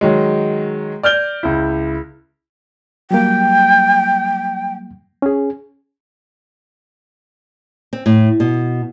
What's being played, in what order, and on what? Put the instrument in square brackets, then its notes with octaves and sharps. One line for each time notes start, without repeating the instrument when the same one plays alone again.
[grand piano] D#3 F#3 G#3
D5 F6 G6 G7
C#2 E4
[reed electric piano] F#3 G3 A#3 [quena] G5
[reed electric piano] C#4 G#4
[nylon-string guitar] C4
A2
B2